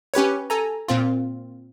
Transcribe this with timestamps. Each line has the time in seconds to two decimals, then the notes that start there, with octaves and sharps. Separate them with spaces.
0.14 C#4 G4 B4 C#5
0.50 A4 G#5 A#5
0.88 A#2 C4 F4